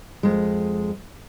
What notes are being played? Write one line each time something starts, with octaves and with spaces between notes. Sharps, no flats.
F2 G#3